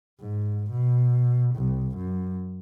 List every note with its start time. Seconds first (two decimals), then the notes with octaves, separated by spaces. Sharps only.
0.20 G#2
0.71 B2
1.56 C2
1.97 F#2